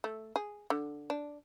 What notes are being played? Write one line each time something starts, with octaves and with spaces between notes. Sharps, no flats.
A3
G#4
D3
D4